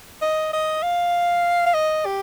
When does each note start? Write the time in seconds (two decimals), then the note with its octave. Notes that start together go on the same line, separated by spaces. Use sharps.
0.22 D#5
0.53 D#5
0.83 F5
1.66 F5
1.74 D#5
2.05 G4